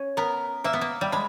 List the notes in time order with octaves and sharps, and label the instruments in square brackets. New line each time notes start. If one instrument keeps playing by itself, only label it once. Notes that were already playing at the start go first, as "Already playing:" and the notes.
Already playing: [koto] C#4
[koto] B3 [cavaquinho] A#4
[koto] A#3 [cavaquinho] E5
[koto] B3
A#3
G3
[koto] G#3 [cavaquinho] B5